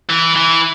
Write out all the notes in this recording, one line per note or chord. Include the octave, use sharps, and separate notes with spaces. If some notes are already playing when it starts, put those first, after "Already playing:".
E3
E3